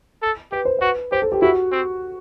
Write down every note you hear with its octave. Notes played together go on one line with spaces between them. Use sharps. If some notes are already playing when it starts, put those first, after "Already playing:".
A4
G4 B4
C5
F#4 B4
G4 C5
A4
G4
E4 F#4
C4